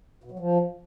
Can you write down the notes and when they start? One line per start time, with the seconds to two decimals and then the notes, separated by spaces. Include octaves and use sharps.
0.24 B2
0.31 F#3
0.39 F3